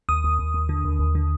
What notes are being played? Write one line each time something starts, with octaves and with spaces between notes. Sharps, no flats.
D#2 D#6
D#2
D#2
D#2
D3
D#2
D#2
D3